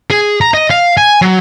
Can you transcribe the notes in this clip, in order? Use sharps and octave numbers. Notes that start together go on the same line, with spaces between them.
G#4
A#5
D#5
F5
G#5
F#3